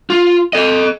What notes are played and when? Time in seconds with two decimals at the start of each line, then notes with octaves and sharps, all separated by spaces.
0.10 F4
0.53 A4 D#5